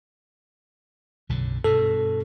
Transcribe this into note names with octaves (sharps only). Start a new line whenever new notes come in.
B1 F#2 D3
G2 B2 A4